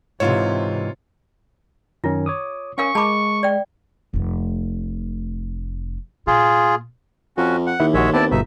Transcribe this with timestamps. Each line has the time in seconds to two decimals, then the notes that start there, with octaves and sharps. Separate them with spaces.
0.20 G#2 C3 E3 F4 C#5
2.04 F#2 D#3 C#4 F4
2.26 C#5 D6 D#6
2.78 C#4 A#4 F5 G#5 C#6
2.95 G#3 A5 B5 D6
3.43 D5 G5
4.14 F1 A3
6.27 A#2 F4 G#4
7.37 F2 C#4 F#4
7.67 F#5
7.80 D#2 D#3 E4 E5
7.94 A#1 G#3 F#4 C#5 E5
8.13 B3 C4 E4 B4 D5 A5
8.31 G1 B2 D#4 E5